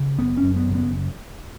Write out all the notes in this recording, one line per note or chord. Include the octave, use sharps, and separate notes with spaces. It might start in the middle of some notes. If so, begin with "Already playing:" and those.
Already playing: C#3
F#1 B3
C#4
F#2
B3
F#1
B3